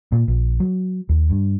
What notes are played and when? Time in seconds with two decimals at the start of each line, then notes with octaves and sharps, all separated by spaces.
0.12 A#2
0.28 A#1
0.60 F#3
1.09 D#2
1.30 G2